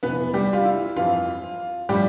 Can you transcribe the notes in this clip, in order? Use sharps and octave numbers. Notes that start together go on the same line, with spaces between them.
F2 C3 E3 B3 B4
G3 G4
F4
E4
F2 E3 F4
A2 F3 G3 G4